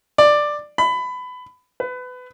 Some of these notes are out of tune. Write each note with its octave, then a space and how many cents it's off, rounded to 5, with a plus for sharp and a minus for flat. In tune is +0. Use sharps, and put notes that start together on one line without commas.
D5 +10
B5 +20
B4 +25